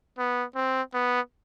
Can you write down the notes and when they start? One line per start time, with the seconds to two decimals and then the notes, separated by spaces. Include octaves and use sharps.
0.18 B3
0.55 C4
0.94 B3